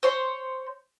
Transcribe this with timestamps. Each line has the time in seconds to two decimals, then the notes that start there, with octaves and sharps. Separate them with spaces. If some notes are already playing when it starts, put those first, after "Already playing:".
0.03 C5 C#5 C6